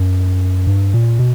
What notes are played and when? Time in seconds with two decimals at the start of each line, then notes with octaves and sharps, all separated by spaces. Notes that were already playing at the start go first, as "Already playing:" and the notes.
Already playing: F#2
0.67 G2
0.94 A#2
1.19 B2